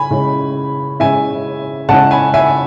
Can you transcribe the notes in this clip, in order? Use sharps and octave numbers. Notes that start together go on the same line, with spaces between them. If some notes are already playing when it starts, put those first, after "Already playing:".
Already playing: C#3 G#5 B5
C#3 G#3 C#4 E4
C#3 G#3 C#4 E4 E5 G#5
C#3 G#3 C#4 E4 F#5 A5
G#5 B5
E5 G#5